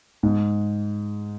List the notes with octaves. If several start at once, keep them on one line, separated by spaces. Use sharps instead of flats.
G#2